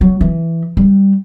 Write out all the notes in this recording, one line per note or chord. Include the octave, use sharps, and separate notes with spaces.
F#3
E3
G3